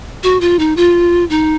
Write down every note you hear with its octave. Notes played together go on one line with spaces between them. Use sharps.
F#4
F4
D#4
F4
D#4